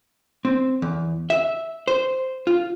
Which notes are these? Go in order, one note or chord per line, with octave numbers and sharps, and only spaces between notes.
C4
E2
E5
C5
F4